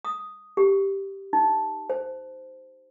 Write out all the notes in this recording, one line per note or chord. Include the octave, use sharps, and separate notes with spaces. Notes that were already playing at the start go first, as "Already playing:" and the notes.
D#6
G4
D#4
C5